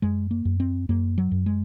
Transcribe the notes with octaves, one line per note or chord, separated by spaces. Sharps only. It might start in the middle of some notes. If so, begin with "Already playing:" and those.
F#2 G#3
A#3
F#2
C4
F#2 A#3
F#3
F#2
G#3